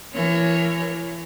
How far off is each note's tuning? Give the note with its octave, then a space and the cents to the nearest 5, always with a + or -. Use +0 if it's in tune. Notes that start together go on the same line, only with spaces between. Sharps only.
E3 +35 A#4 +10 C#5 +0